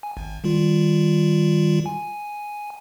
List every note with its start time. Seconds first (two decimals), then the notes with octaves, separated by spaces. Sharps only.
0.03 G#5
0.17 G#1
0.44 D#3 G3 F4
1.86 G#5